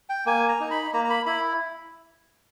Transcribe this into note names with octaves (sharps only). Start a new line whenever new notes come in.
G5
A#3 G#5
A#5
D#4
B5
A#3 A#5
A#5
B5
E4 B5